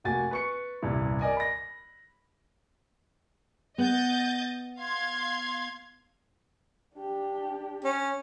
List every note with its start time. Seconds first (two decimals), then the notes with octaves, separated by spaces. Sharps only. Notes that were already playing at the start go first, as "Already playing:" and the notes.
0.04 F1 A#3 F#4 G#5 A6
0.31 B4 C#6 C#7
0.82 D#1 C2 G2 E4
1.21 A#4 D5 D#5 G#5
1.37 B5 A#6
3.78 B3 D#5 G6 A6
4.80 F5 C6 G#6
6.97 D4 G4
7.84 C#4